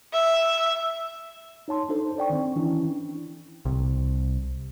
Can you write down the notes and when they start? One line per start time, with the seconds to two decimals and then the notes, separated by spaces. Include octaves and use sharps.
0.14 E5
1.68 D#4 C#5 A5 C6
1.89 D4 D#4 A4 C5
2.18 D5 G5 C#6
2.30 D#3 C4
2.56 E3 C#4 D4 E4
3.65 C2